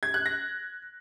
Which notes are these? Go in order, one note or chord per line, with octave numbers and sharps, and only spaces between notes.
G#6
F#6
A#6